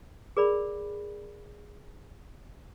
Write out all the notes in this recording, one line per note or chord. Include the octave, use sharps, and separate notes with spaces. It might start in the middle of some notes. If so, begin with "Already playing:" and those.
G#4 A#4 D5 B5